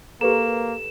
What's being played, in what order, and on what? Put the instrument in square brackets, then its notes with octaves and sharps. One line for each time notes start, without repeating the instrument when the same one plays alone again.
[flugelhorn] A#3 [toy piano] G4 B4 A#5 [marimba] A4 [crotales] E7